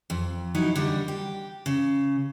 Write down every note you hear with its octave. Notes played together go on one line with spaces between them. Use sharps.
F2
F#3 D#4 E4
D3 G3 A#3
G4
C#3